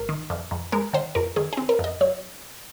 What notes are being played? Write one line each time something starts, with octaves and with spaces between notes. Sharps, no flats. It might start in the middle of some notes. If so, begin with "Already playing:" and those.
Already playing: G#1 A#4
D#3
F2
F2
G#3 A#4
D#3 C5
F2 A#4
D#3 G#4
C4 G#4
A#4
F2 D#5
F#3 C#5